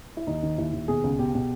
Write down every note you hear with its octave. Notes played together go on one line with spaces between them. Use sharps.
E4
D#2 D#4
D#3
D#2 E4
D#2
B2 G#4
C#2
B2 G4
B2